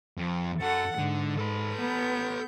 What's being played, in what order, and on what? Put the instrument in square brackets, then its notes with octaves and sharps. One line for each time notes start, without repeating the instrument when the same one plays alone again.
[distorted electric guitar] F2
[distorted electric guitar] F#2 [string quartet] A4 F#5
[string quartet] G#2 [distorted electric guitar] D3
[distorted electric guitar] A4 B4
[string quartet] B3 G6